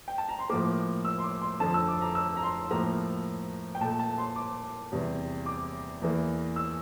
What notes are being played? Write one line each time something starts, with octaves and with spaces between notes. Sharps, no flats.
G5
A5
A#5
C6
A2 F3 A#3 D6
E6
C6
D6
C6
F2 D3 F3 A5
E6
D6
A#5
E6
A#5
C6
A2 F3 A#3 A#5
G5
A#2 A3 A5
A5
C6
D6
E2 C3 G3
D6
E2 E3 A#3
E6